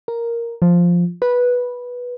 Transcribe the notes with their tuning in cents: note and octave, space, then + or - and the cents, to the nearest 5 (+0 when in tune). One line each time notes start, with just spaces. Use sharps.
A#4 +0
F3 +0
B4 -10